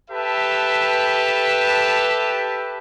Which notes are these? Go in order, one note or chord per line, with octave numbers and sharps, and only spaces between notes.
G4 A4 B4 E5 A5